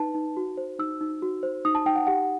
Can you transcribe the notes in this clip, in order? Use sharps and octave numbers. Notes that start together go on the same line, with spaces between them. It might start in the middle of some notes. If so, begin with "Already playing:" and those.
Already playing: D#4 B4 A5
D#4
F#4
C5
D#4 E6
D#4
F#4
C5
D#4 D#6
A5
D#4 G5
F#5
G4 F#5